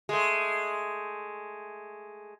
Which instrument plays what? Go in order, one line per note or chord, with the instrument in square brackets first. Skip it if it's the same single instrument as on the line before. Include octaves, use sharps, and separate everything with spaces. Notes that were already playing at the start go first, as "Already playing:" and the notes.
[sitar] G#3 A3